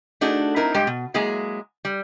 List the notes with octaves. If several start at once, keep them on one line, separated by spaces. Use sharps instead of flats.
A3 D4 D#4 F#4 G#4 A4
C4 D#4 E4 A#4
G2 G#3 G4 G5
B2
F#3 G#3 A#3 E4 G#4
G3